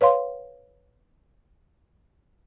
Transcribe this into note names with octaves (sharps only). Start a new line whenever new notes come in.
B4 C#5 F5 C6